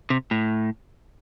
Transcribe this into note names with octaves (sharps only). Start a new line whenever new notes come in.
C3
A2